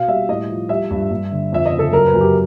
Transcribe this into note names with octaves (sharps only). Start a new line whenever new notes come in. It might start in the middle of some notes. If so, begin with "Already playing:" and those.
Already playing: B2 F5
G3 E5
A2 D#5
F3
G3 E5
G2
G2
D3
F2 E5
D#5
C#3
A4
F#2 A#4
B4
F#2
G4